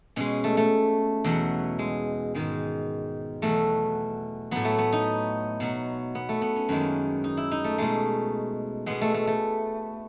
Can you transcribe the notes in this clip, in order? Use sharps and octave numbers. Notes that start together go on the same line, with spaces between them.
B2 G#3 C#4
A3
A3
E2 B2 F#3
G#3
G#2 D#3 G#3
E2 B2 F#3 A3
A2 F#3 B3
A3
B3
D#4
B2 F#3
B3
A3
B3
C#4
F#2 D#3 G#3
D#4
E4
D#4
A3
B2 G#3 A3
B2 G#3 B3
A3
A3
A3